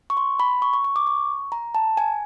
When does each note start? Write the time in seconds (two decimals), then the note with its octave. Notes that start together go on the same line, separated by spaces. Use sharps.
0.10 C#6
0.17 C6
0.40 B5
0.62 C#6
0.73 C#6
0.84 C#6
0.96 D6
1.07 C#6
1.52 A#5
1.75 A5
1.97 G#5